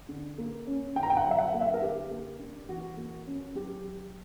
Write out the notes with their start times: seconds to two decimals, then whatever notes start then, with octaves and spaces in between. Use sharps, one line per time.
0.09 D3
0.38 A#3
0.67 C#4
0.95 D3 G5
1.03 A#5
1.10 G5
1.17 F#5
1.24 F#3
1.31 E5
1.38 F#5
1.54 A#3
1.61 E5
1.74 A#4
1.82 D3 G4
2.10 A#3
2.39 D4
2.68 E3 F#4
2.97 A#3
3.27 C#4
3.55 F#3 G4